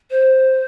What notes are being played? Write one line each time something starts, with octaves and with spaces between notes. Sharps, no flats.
C5